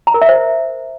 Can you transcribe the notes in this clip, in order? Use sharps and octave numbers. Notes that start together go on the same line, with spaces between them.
A#5
A#4
E5
C5